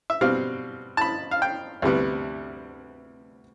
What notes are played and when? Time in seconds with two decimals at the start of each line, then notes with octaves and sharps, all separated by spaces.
0.10 E5
0.21 B2 G3 C4 F5
0.97 A5
1.01 B5
1.31 F5
1.42 G5
1.82 D2 C3 G3 B3